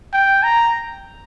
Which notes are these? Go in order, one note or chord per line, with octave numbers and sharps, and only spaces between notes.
G5
A#5